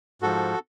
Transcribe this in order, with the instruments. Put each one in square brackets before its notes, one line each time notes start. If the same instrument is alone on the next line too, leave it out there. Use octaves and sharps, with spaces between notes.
[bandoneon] G#2 F3 F#4 A4